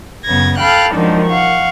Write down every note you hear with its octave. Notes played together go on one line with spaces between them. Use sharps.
F#2 C#3 B3 G#6 A#6
A4 F5 G5 B5 F6 F#6
F#2 D#3 F3 G#3 D4 D#4
F5 F#5 C#6